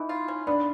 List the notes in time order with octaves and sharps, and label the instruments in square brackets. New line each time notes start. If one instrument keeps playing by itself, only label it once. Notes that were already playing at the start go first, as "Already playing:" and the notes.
Already playing: [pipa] E3 [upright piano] D#4
[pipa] F4
C#4
[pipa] B3 [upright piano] D4